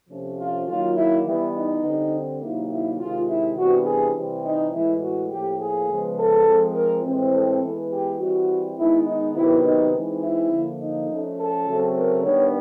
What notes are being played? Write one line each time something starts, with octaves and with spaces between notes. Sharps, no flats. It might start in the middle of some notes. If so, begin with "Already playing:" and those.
C3 F3 A3 C#4
F4
D#3 F#3 A#3 F4
E4
E3 G3 B3 E4
D#4
D3 G3 C4
C3 D#3 F#3 A#3 D#4 E4
E4
C3 D#3 G#3 F4
E4
C3 E3 G3 B3 D4 F#4
G#4
C3 E3 G3 C4
D#4
A2 E3 G#3 E4
F#4
A2 F3 A#3 G4
G#4
C#3 F3 G#3 B3
A4
F3 G#3 C4
A#4
A2 E3 G#3 C4
A4
E3 G#3 B3
G4
E3 G3 C4 F#4
D#3 G#3 B3 D#4 E4
D#4
C3 D#3 F#3 B3 E4
D#4
E3 G#3 C4 D#4
E4
D3 F3 A#3
D#4
F3 A3 C#4
A4
C#3 F#3 A3 C4
A#4
D#3 G3 B3 D4 C#5